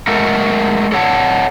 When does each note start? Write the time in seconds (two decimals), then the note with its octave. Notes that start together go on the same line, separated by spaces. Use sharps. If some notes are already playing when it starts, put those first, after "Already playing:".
0.07 G#3 A3 F#4 A4 A#4
0.92 A4 C#5 F#5 A5